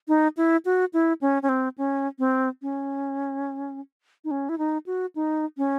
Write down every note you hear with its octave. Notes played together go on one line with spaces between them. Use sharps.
D#4
E4
F#4
E4
C#4
C#4
C4
C#4
C4
C#4
D#4
C#4
E4
D#4
F#4
D#4
C#4